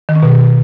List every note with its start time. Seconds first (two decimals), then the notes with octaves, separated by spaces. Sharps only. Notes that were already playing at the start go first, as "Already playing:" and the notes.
0.09 D#3
0.16 C#4
0.23 B2